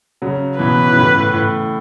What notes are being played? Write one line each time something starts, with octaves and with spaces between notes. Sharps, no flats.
C#3 F#3
B2 E3 B4
E3
A2 C#3
A2
A2